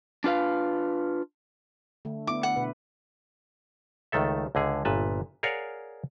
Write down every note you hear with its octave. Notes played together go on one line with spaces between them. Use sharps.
D4 F4 B4 F5
D3 A3
B3 D4 E4 D6
F#5
B2 B4
C#2 D#3 A3 A4 E5
C#2 D3 G#4
G1 A#2 B4 E5 A5
G#4 A#4 C#5 D5 F5 F#5